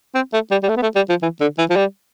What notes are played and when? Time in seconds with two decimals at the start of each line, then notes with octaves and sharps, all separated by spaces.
0.15 C4
0.33 A3
0.51 G3
0.63 G3
0.69 A3
0.77 B3
0.82 A3
0.96 G3
1.09 F3
1.22 E3
1.41 D3
1.58 E3
1.70 F3
1.76 G3